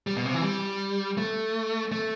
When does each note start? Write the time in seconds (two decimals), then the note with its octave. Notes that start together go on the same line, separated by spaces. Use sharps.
0.07 G3
0.16 B2
0.25 C3
0.34 E3
0.43 G3
1.18 A3
1.92 A3